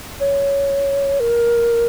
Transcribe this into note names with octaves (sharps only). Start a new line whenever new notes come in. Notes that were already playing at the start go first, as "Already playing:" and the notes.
C#5
A#4